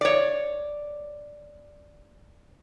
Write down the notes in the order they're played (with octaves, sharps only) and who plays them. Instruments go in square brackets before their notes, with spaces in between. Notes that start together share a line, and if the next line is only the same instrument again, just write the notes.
[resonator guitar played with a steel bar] C#5 D5